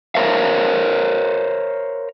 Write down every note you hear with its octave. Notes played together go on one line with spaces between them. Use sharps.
A#4 C5 C#5 E5 F5